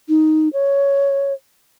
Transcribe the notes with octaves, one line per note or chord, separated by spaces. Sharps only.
D#4
C#5